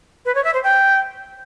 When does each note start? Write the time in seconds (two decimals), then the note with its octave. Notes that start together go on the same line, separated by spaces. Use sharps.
0.25 B4
0.34 C#5
0.44 E5
0.53 C5
0.63 G5